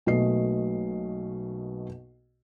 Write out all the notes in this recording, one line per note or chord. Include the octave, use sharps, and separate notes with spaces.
B1 B2 A3 A#3 D#5 C7